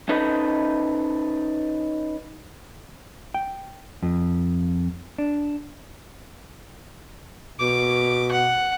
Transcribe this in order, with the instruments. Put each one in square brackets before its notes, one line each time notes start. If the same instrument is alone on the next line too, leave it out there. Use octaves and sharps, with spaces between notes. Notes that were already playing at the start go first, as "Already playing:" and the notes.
[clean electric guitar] C#4 D#4 A4 B4 D#5
[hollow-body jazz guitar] G5
F2
D4
[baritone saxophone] B2 [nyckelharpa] D6
[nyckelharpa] F#5